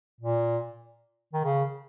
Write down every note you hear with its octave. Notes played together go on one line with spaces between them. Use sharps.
A#2
D#3
C#3